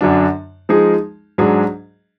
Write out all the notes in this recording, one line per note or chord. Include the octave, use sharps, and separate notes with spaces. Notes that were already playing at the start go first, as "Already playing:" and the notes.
F#2 D3 F#3 D4
F3 G#3 D#4 G#4
G#2 F#3 D4 G#4